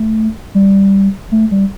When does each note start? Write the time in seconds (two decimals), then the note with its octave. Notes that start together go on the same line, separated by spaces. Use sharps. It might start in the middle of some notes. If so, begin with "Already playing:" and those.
Already playing: A3
0.55 G3
1.32 A3
1.51 G3